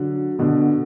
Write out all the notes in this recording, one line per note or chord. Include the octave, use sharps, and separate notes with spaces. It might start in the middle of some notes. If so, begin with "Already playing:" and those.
Already playing: D3 F#3
B2 D3